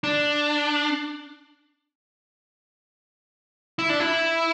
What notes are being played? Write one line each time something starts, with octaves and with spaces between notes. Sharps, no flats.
D4
E4
D4
E4